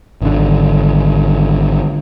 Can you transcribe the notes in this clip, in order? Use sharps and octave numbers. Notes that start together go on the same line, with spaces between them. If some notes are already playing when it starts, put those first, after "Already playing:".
G#1 D3